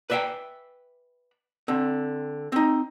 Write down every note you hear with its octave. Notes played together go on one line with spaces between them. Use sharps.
B4 D5 E5 F5 G5 G#5
D3 C4
C4 D#4